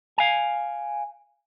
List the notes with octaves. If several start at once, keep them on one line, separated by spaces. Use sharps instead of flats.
F5 G#5